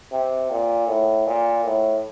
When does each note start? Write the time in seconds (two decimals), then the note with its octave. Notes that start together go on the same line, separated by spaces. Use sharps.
0.12 C3
0.51 A#2
0.88 A2
1.27 A#2
1.65 A2